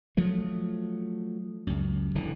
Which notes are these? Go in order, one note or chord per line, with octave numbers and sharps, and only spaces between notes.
F3 F#3 A3
C#2 F#2
D1 D3 E3